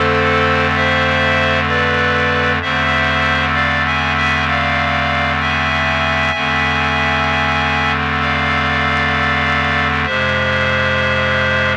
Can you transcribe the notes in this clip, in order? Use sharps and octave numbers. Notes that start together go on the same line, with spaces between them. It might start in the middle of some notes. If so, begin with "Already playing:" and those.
Already playing: F2 D3 A3 C4 A4 C5
C5 E5
B4 D5
E2 D3 A3 C4 C5 E5
D5 F5
E5 G#5
E5 G#5
D5 F5
E5 G#5
E2 D3 A3 C4
D5 F5
F2 C3 G#3 C5 E5